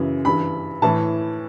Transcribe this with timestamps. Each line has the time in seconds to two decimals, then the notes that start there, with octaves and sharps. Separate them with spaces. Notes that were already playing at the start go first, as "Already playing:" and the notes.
Already playing: F#2 C#3 E3
0.25 G2 E3 B5
0.82 A2 E3 A5